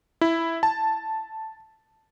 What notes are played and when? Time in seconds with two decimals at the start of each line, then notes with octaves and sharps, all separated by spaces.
0.21 E4
0.63 A5